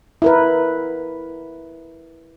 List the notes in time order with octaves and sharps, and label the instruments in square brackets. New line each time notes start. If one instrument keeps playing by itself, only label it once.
[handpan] E4 A#4 B4